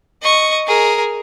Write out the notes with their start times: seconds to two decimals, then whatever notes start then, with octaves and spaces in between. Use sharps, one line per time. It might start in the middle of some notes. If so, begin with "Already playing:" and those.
0.22 D#5 C#6
0.67 G#4 A#4